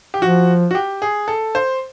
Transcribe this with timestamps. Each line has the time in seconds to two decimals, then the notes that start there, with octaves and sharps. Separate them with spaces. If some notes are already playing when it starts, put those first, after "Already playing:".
0.14 G4
0.21 F3 F#4
0.71 F#4
0.75 G4
1.02 G#4
1.28 A4
1.55 C5